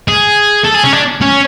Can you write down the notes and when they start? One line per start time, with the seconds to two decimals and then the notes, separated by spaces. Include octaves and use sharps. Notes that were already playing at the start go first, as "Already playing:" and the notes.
0.08 G#4
0.65 A4
0.75 G#4
0.84 C#4
0.93 D4
1.21 C#4